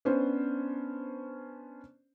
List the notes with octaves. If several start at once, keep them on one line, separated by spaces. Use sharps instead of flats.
B3 C#4 D4 C5